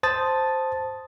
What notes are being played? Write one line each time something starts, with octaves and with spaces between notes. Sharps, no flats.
C5 A5 D#6 A6